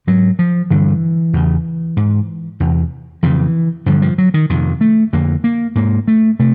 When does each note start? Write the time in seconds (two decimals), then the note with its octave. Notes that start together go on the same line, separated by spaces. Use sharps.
0.07 G#2 F#3
0.39 F3
0.70 G2 D3 E3
1.33 E2 C#3
1.97 G#2
2.60 E2 C3
3.23 F2 C#3 E3
3.86 G2 D3 F3
4.02 F3
4.18 F#3
4.34 D#3
4.50 F2 C3 D#3
4.81 A3
5.13 F2 D3 A#3
5.44 A#3
5.75 G#2 A#3
6.08 A3
6.39 C3 A3